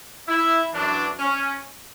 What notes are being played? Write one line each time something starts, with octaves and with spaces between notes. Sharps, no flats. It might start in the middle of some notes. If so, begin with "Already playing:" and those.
E4
F#2 E3 D4
C#4